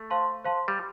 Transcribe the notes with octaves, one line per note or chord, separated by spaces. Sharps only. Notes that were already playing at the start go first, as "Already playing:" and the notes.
Already playing: A3
C5 F5 A5 C6
C5 F5 A5 C6
G3